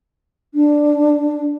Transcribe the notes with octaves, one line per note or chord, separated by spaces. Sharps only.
D4